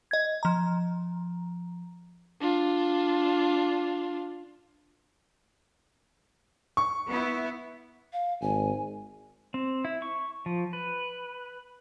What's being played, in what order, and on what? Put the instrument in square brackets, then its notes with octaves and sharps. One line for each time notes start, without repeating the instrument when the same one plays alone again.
[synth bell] D#5 G#6
F3 A#5
[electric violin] D4 F4
[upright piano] C#6
[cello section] B3 E4
[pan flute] F5
[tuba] G#1 [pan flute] G#5
[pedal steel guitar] C4
E4
C#6
F3
B4